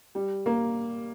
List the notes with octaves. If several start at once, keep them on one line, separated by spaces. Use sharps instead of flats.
G3
A#3